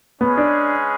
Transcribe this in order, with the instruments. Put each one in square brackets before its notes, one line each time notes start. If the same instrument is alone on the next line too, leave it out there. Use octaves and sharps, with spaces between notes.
[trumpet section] G#3 C#4 G#4 B4 [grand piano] B3
[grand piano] D4